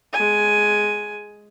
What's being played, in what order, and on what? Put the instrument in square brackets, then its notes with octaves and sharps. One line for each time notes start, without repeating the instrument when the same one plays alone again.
[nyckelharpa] G#3 G#5